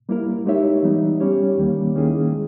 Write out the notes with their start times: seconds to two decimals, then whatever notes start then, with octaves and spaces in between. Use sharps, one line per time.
0.09 G3 A#3 E4 A#4
0.46 G#3 D#4 G4 C#5 E5
0.83 E3 G3 B3 D#4
1.20 G3 C#4 G4 C#5
1.57 D#2 D#3 G3 A#3
1.95 D#3 A#3 C#4 E4 G#4
2.32 G#3